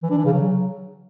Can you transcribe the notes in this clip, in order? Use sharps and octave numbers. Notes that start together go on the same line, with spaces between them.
E3
D4
E3
C#3
F#3